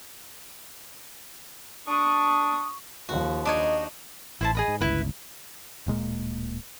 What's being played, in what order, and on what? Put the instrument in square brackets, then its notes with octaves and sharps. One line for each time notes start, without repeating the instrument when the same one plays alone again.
[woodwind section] D4 D#6 [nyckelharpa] C#6
[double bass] D#2 F3 [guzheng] F#4
[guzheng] D4 D#4 C#5 [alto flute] D#5
[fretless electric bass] A1 [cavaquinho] E4 C5 A5
[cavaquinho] G#4 D#5 B5
[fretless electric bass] G#2
[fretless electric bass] G1 C#2 [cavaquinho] E4 B4
[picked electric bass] D1 A#2 G#3 A#3